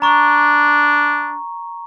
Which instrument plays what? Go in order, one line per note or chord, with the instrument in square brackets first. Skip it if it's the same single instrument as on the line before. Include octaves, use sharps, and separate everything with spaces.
[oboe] D4 [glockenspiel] A#5 C#6